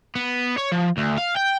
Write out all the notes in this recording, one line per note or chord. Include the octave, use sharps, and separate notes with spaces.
B3
C#5
F3
D2
F5
G5